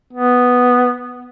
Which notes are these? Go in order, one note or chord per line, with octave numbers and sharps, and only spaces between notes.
B3